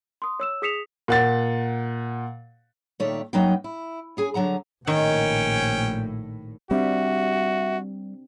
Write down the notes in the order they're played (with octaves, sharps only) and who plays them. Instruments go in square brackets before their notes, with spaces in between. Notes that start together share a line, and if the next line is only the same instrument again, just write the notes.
[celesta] C6 D#6
C#5 E6 E7
G#4 D#6 B6 C#7 E7 F7
[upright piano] A#2 F#5 A6
[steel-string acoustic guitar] A#2 D#3 A3 G4 C#5
F#2 F#3 A#3 D#4 B4 G5
E4
C#4 G#4 G#5
D3 F#3 F#5 A#5
[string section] A#1 A2 [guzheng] D#3 [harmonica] C#4 G5
[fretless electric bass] G3 [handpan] C4 D4 G4 [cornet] F#4 [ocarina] E5